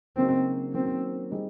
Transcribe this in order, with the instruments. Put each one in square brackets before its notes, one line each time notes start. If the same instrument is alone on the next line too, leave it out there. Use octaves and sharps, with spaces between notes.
[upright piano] C#3 F#3 A#3 D#4 F#4 [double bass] C4
[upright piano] D#3 F#3 A#3 C#4 [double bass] C4
[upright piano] G3 C4 D#4 G#4